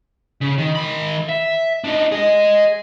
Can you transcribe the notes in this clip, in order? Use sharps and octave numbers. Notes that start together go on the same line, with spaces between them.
C#3
D#3
D#3 B5
E5
D4 D#4
G#4 D#5